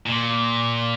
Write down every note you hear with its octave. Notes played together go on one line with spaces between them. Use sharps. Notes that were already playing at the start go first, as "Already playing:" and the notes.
A#2